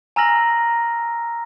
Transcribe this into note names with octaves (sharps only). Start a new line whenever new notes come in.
G#5 A#5 E6 F6 A#6 F#7